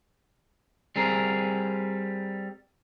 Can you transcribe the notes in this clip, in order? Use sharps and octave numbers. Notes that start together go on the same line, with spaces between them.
G3 C4 G#4 A#4